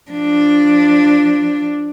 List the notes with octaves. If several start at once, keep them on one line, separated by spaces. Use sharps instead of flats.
F3 D4